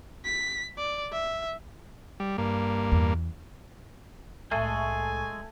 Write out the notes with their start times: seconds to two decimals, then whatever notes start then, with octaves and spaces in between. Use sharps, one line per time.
0.25 B6
0.78 D5
1.13 E5
2.20 G3
2.38 G2 A#3
2.92 E2
4.51 C2 A2 G#3 A3 G#4 A4 G#5